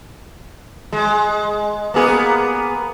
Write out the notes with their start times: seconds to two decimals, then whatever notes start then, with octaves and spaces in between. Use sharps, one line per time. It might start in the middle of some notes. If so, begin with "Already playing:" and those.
0.93 G#3
1.94 A#3 B3 G#4